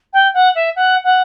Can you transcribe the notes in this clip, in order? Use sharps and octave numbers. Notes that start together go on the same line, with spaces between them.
G5
F#5
E5
F#5
F#5